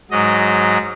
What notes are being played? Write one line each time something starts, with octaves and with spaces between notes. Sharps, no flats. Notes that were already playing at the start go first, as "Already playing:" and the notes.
G#2 F#3 D#5